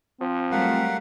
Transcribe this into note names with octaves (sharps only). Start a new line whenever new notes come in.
F3 C4
F#3 G3 A3 A#4 F5 F#5